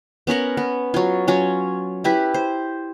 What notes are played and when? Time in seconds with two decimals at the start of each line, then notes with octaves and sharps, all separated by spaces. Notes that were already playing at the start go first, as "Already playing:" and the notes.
0.27 B3 C#4 A#4 F#5
0.57 B3
0.94 F#3 F4
1.28 F#3 C#4 F4
2.04 E4 G4 B4
2.34 C5